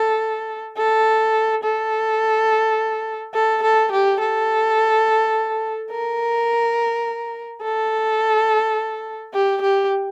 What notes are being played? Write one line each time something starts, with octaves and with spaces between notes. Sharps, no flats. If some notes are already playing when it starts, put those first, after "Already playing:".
Already playing: A4
A4
A4
A4
A4
G4
A4
A#4
A4
G4
G4